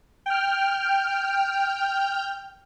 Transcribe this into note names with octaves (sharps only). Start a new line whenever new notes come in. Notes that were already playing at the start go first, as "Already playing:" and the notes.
G5 F6